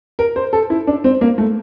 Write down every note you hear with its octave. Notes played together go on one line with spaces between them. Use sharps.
A#4
C5
A4
E4
D4
C4
A#3
A3